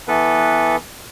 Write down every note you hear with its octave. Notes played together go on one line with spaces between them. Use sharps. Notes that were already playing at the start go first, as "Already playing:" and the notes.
E3 B3 A4 B4